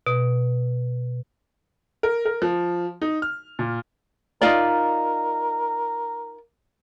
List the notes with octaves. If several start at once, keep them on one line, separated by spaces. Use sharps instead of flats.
B2
A#4
A#4
F3
D#4
F6
A#2
D#4 F4 A#4 D5